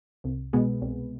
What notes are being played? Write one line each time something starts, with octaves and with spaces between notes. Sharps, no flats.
C2
B2 G#3 B3
C2